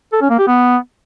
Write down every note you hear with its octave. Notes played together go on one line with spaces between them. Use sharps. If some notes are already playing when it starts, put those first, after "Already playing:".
A4
C#4
A#3
G4
B3